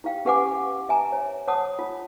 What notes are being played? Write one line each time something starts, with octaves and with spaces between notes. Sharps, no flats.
E4 G4 F5 G5
C#4 G4 B4 F#5 G#5 D6
E5 G#5 A#5
C#5
C#5 F#5 A5 D#6
F4